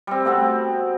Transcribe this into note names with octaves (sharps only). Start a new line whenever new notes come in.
G3 C4
A3 B3 C4 F#4